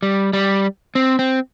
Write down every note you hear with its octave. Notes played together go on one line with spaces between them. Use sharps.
G3
G3
C4
C4